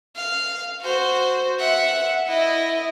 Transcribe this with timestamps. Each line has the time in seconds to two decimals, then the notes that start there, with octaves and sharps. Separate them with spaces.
0.16 F5
0.82 F#4 C5
1.59 E5 F#5
2.28 E4 D#5